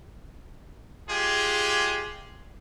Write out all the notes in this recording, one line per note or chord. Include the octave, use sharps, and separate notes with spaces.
G#3 F4 G4 G#4 G#5